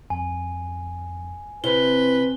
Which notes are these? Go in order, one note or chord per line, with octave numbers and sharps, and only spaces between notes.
F2 G#5
C3 E4 B4 C5 G7